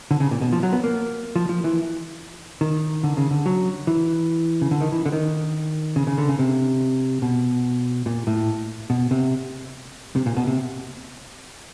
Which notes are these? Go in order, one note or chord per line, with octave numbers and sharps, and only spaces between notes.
D3
C#3
A#2
B2
F3
F#3
B3
A#3
F3
F3
E3
D#3
D3
C#3
D3
F#3
E3
C#3
D3
D#3
E3
D3
D#3
C#3
C#3
D3
C#3
C3
B2
A#2
A2
B2
C3
C3
A#2
B2
C3